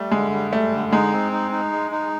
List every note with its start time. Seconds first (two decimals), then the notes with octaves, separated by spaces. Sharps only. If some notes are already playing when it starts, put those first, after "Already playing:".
Already playing: G3 A3
0.11 D3 G#3
0.32 G3
0.51 G3 A3
0.72 D3
0.92 G#3 D#4
1.12 C4
1.32 D#4
1.51 D#4
1.72 G#3
1.92 D#4